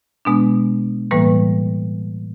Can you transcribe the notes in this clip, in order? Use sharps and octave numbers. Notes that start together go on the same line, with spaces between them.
B2 G#3 B3 D4
A2 E3 G3 A#3 B4